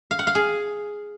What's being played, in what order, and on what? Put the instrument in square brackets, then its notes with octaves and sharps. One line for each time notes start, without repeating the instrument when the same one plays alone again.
[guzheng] F5
F#5
F5
G#4